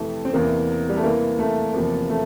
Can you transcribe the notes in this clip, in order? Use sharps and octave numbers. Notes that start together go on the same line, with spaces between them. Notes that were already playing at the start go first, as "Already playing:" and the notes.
Already playing: F2 C3 E3 A3
C4
E2 C3 E3 A#3
G3
A3
E2 C3 E3 A#3
A3
E2 C3 F3 A#3
A3